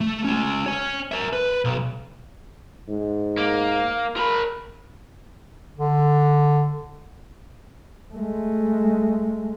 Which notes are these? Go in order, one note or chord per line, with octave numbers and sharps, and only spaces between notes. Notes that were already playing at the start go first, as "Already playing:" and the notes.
A3
G#3 C#4
C#5 G#5
A#4 E5
B4
B1
G#2
A#3
A#4 B5
D3
G#3 A3